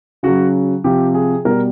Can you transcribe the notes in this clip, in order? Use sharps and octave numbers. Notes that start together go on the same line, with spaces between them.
C#3 F#3 F#4
C3 F3 G4
G#4
B2 G3 A#4